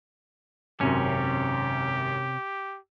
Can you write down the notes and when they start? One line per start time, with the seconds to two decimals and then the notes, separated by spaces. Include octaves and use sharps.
0.81 G#1 F#2 C3 C#4 G4